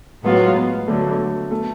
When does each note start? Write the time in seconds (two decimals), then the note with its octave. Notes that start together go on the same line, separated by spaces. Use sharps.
0.24 A2 F#3 G#3 B3 F4
0.56 B3
0.88 D2 D3 F#3 A3
1.51 A3